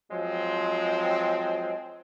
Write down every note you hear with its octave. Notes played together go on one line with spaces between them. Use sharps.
F3 F#3 G#3 C4